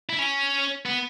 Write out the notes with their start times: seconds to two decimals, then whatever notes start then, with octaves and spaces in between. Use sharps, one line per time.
0.09 E4
0.19 C#4
0.86 B3